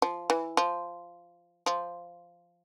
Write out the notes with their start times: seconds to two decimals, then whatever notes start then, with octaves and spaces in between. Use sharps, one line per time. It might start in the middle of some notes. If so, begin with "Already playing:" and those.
0.02 F3
0.30 E3
0.57 F3
1.66 F3